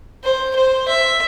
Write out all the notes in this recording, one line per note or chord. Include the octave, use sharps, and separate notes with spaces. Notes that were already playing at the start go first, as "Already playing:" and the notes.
C5
C5
E5